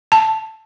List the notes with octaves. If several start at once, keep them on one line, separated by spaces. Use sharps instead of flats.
A5